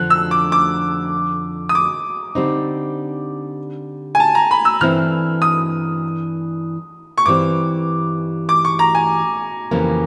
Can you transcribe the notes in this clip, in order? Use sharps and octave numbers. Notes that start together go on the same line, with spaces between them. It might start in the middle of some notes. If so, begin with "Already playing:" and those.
Already playing: F2 D3 F3 F#6
E6
D6
D6
D#6
D6
D3 G3 C4 D#4
G#5
A5
A#5
B5
E6
G2 E3 A3 C4 E4 F6
D#6
C#6
G2 E3 G3 C4 D6
D6
C#6
A#5
G#5
F2 C#3 E3 G3 A#3